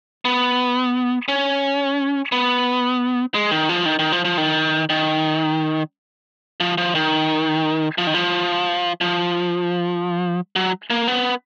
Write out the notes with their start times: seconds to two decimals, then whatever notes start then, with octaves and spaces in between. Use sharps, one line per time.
0.25 B3
1.28 C#4
2.32 B3
3.35 G#3
3.51 D#3
3.69 F3
3.86 D#3
3.99 D#3
4.12 F3
4.25 F3
4.38 D#3
4.90 D#3
6.60 F3
6.78 F3
6.95 D#3
7.98 F3
8.07 D#3
8.14 F3
9.01 F3
10.56 F#3
10.90 A#3
11.07 B3